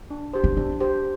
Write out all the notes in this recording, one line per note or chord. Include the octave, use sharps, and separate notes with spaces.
D4
G4 C5
D4
C4 D4
G4 C5